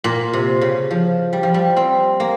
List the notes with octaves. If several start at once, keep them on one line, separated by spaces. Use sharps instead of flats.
A#2
C3
C#3
F3
G3
F3
G3
C4
A#3